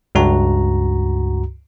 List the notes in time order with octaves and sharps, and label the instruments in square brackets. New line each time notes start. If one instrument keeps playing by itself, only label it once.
[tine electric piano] C#2 G2 F#4 A#5